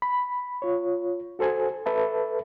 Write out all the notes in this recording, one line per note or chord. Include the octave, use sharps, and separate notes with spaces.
B5
F4 C#5
F#4 A4 C5 G#5
A4 B4 E5 A5